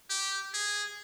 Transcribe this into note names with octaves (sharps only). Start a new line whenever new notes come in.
G4
G#4